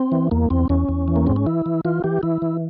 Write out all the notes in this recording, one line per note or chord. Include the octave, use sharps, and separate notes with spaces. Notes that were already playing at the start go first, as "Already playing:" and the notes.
Already playing: C4
E3
E2 A#3
E2 C4
E2 C#4
E2
E3
A#3
G#2 C4
C#4
E3 E4
E3
E3 F4
E3 G4
E3 E4
E3